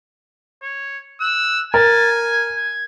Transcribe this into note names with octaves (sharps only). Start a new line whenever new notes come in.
C#5
E6 F#6
A#4 G#5 A6
G#6
G#6